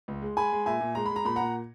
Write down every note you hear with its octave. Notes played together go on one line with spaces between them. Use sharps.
C#2
G#3
G#3 G#5 B5
G#3
A#2 E5 G#5
A#2
G#3 A#5
G#3 B5
A#5
A#2 B5
A#2 F#5 A#5